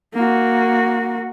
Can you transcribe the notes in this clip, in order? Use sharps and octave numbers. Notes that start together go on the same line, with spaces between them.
A#3 F#4